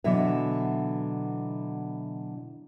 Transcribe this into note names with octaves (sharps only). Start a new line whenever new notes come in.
B2 D3 E3 F#3 E5